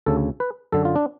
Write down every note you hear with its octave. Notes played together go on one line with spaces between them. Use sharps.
D2 C#3 A4
B4
F#2 D3 A4
F4
D4